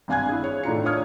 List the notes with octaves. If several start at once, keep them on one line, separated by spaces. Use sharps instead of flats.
G#1 G2 F5 G#5 F#6 G#6
E4 G#4
C#5
A2 D#3 D4 D#4 F4 C#7
C#5 D5 F5 D#6 F6 G#6